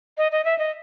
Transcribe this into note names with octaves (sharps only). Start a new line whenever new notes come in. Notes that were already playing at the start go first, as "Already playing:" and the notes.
D#5
D#5
E5
D#5